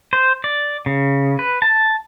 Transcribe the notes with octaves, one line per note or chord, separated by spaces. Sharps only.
C5
D5
C#3
B4
A5